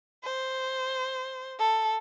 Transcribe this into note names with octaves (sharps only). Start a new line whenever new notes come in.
C5
A4